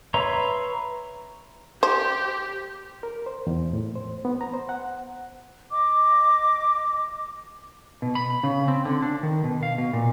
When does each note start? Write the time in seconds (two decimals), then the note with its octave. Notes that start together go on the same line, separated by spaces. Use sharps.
0.14 B4 C#5 E5 A#5 C6
1.83 G4 C5
3.03 A#4
3.26 C5
3.47 E2
3.73 A2
3.96 C5
4.25 B3
4.41 A#5
4.54 C5
4.69 F#5
5.71 D#5 D6
8.02 B2
8.15 B5
8.43 C#3
8.68 C4
8.85 D3
9.02 D4
9.23 D#3
9.44 B2
9.63 F5
9.78 B2
9.93 A#2